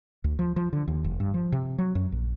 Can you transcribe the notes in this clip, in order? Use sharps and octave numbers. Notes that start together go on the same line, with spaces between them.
D2
F3
F3
D3
D#2
F1
G2
F3
C3
F#3
F#2
A#1